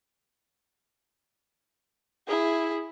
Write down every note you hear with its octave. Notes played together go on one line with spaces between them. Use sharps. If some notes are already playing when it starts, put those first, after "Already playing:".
E4 G#4